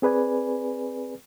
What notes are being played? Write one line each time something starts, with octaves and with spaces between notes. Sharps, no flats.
C4 G#4 B4 D5 G#5